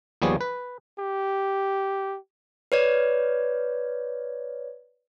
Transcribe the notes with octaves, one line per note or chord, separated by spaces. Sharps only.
D#2 F3 G3 B3 G#4 C#5
B4
G4
B4 C#5 D5